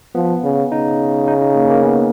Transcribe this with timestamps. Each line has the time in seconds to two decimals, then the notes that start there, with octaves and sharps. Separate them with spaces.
0.15 F3 B3
0.44 C#3
0.72 C#3 D#4
1.28 D#4
1.41 D#4
1.55 A#3
1.70 A#3
1.84 B3